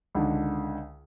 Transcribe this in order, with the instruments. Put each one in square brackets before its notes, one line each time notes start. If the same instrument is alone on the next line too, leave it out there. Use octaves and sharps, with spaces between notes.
[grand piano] C#2 D3 D#3